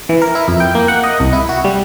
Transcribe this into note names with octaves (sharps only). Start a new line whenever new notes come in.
E3
A#4
E4
F2
G5
A#3
F#5
D#5
C2
E4
F#4
G3